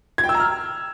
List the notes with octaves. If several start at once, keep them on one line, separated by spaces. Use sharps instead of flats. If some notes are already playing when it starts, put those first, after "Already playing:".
G#6
G5
E6
A#5
F6